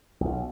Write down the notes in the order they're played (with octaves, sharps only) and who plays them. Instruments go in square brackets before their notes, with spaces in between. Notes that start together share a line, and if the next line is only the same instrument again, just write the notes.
[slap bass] B1